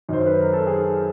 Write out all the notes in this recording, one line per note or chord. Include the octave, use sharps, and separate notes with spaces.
F#2 D#3 C5
B4
A#4
A4
G#4